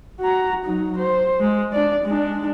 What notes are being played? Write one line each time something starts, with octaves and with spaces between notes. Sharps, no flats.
F#4 A#5
F#3 D#4
C5
G#3
D4 D5
G#3 D4